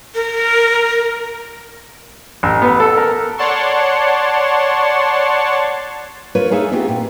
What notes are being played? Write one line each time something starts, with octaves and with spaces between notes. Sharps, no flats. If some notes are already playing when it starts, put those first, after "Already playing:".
A#4
A1
B3
A4
A#4
C#5 D5 F#5 A5 C6 C#6
F4 A#4 B4 C#5
D#4 G#4 A4 E5 F5
B3 C4 F4 G4 G#4
A#2